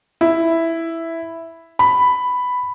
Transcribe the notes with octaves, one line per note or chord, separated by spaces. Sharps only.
E4
B5